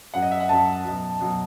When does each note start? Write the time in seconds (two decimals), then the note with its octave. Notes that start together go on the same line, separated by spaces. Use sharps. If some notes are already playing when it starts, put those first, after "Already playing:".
0.14 F#2 F#3 F#5
0.22 D#5
0.31 E5
0.40 F#5
0.49 F#2 F#3 A5
0.85 B2 F#3
1.20 B2 F#3